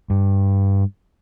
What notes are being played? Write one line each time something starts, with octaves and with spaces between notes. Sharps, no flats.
G2